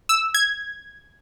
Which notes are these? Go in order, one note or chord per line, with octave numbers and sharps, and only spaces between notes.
E6
G#6